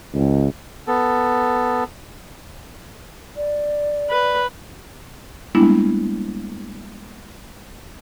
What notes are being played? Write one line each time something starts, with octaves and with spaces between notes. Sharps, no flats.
C#2
B3 A4
D5
B4
G3 G#3 A#3 B3 D4 E4